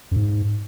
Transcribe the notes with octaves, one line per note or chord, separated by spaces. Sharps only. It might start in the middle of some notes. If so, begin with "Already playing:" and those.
F#2
G#2